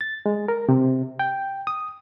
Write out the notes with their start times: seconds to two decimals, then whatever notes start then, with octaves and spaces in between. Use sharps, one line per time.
0.01 A6
0.26 G#3
0.48 A#4
0.69 C3
1.19 G5
1.67 D#6